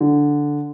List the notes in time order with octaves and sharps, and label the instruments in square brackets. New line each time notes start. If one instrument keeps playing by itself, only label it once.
[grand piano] D3